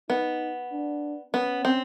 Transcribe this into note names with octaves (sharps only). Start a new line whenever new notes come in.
B3 D#4
D4
B3 C#4
C4